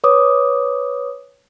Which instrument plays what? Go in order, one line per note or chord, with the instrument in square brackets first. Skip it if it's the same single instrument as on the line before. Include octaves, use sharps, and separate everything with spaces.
[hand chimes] B4 C#5 D6 D#6